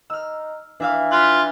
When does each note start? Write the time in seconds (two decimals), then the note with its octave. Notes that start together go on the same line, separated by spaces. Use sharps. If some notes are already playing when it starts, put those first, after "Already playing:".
0.10 D#4 E6 F6
0.80 E3 D4 E5 F5
1.12 F4 F#6 B6